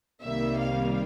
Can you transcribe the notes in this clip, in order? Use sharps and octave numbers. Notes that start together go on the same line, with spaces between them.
C2 C3 D#3 G3 A#3 E5
F5